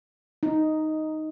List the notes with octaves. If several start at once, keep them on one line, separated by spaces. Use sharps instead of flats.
D#4